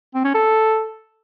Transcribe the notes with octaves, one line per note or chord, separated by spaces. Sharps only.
C4
C#4
A4